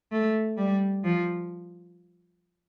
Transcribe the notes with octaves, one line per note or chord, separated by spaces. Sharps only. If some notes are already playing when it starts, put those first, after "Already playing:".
A3
G3
F3